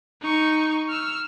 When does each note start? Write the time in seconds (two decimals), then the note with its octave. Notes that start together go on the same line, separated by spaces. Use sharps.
0.21 D#4 C#6
0.89 E6 F6